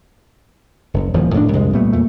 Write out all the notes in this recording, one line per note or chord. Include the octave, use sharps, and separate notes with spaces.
F#1
D#1 E2 A#2 F3
D#1 A2 A3 D4
C2 F2 G#3
A#2 G3 A3 B3
E2 A#2 A3